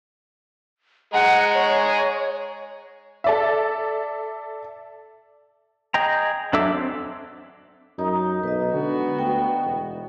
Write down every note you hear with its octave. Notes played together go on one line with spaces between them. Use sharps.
G#3 G#4 F#5 A#5
C#5
A4 D5 E5
G#4 D#5 G5 A#5
F#3 D4 A4 E5 D6
C4
F#2 D#4 D#6
B1 B4 D#5
D3 G#3 B3 F#4
D2 G5
E1